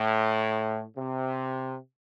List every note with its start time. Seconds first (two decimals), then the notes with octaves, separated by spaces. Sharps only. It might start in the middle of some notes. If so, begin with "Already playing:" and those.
Already playing: A2
0.97 C3